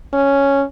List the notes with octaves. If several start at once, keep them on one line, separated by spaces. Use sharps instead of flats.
C#4